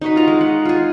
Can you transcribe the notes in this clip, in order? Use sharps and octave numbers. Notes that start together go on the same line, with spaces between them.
D#4 F#4 B4
F4 A#5
G#3
F#5
F4 G#4